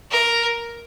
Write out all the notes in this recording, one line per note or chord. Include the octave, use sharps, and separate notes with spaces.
A#4